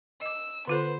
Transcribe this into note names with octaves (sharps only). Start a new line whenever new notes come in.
D#5 D6 E6
D3 B3 F4 A4 C5